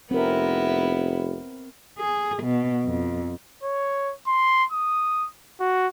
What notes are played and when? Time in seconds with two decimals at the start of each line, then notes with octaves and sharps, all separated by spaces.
0.11 F1 B3 C4 E4 A#4
1.98 G#4
2.43 B2
2.85 F2
3.63 C#5
4.27 C6
4.72 D#6
5.60 F#4